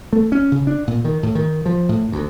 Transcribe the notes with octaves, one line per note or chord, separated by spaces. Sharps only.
A3
C#4
C#3
D4
A#2
D#3
A2
D#3
F3
A2
D2